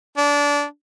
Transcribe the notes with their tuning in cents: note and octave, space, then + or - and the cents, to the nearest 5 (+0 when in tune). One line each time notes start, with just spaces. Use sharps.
D4 -20